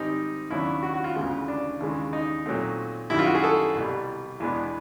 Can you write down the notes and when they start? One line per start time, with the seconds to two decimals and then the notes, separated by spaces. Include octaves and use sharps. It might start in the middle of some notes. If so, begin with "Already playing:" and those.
Already playing: G#2 D#3 G3 C4 D#4
0.50 D#2 C#3 F#3 B3 D4 E4
0.82 F#4
0.94 F#4
1.04 F4
1.16 D2 C#3 E3 G#3 B3 F4
1.48 D4
1.80 D#2 C#3 E3 G#3
2.13 D#4
2.46 A#2 F#3 A3 C4
3.10 F#2 D#3 G3 E4
3.19 F4
3.27 F#4
3.35 G#4
3.44 A4
3.75 C2 B2 G3
4.40 E2 B2 G#3 B3 D4